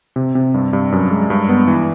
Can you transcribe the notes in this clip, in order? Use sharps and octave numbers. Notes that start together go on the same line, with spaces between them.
C3
C3
G2
G2
F#2
G#3
G2
B3
E3